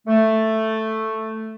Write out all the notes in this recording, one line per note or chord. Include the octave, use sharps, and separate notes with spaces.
A3